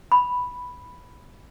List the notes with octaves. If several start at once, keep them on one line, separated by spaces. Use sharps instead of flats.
B5